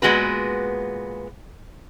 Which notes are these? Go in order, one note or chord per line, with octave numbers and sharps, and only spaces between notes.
A#2 F3 G#3 B3 F#4 B4